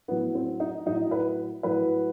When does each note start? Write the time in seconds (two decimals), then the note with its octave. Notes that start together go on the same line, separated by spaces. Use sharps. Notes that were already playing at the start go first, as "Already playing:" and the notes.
0.08 A2 F#3 B3
0.35 C4
0.60 D#4
0.86 A2 F#3 D#4
1.11 B4
1.63 A2 F#3 B4